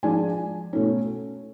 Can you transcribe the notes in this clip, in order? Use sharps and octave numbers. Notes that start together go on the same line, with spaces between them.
F3 G#3 D4 G#5
B2 A3 C#4